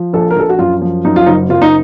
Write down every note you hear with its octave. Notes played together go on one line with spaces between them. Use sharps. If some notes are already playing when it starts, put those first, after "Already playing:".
Already playing: F3
A#1 A4
A#4
A#1 A4
F#4
F#2 F4
F3
F#2 D#4
F4
F#1 D#4
F#1 F4
D#4